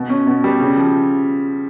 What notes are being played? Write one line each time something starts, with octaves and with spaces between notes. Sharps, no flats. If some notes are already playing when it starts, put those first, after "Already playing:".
Already playing: B2
C#4
B2
G3
C#3
F3